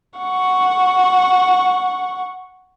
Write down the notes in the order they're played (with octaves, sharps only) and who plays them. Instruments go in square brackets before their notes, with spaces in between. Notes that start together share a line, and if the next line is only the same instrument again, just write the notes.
[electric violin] F#5 C#6